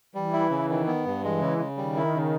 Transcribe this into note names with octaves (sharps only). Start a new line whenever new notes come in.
E3 G3
E4
C#3
D#3
B3
G2
E3 G#3
C#3
C#3
D#3 G3
E4
C#3